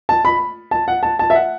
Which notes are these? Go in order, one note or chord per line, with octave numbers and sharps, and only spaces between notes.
A5
B5
A5
F#5
A5
A5
E5
F#5